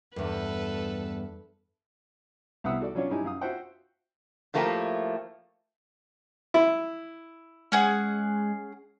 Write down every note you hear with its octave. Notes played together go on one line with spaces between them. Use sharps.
E2 G2 A4 B4
C2 B3 E5 F#5 D#6 E6
F#4 A4 D5
F#3 C#4 D4 F4 C#5
G2 D#4 E4 G4 G#5
F#2 F5 D#6
F4 F#4 C5 E5 F#5 G5
A2 F3 A3 A#3 F#4 G4
E4
G#3 C#4 G#4 F#5